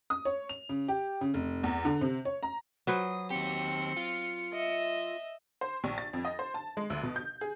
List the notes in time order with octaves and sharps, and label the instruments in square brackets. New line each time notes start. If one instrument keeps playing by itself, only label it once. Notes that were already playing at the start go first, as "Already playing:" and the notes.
[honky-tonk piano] D#6
C#5
F7
C#3
G4
C#3
F1
E2
D3
C3
C#5
A#5
[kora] F#3 B4 C5 [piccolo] D#6
[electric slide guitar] D#3 G4 [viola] C4 [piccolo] C#7
[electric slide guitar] F4
[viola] D#5 E5
[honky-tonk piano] C5
A#1
A6
F2
D#5
C5
A5
G#3
D2
B2
G6
G#4